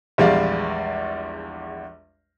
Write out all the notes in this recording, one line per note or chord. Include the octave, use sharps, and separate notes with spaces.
A#1 E2 G3 G#3 D5 F5